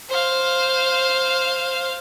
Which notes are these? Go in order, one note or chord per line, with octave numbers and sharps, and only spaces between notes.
C5 F5